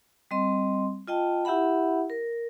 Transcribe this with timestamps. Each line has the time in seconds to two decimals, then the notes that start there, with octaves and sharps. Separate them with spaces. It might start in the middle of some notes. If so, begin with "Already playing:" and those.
0.31 G3 C4 D#5 C6
1.08 F4 D#5 G5 A5
1.45 E4 G4 E5 F#5 B5
2.10 A#4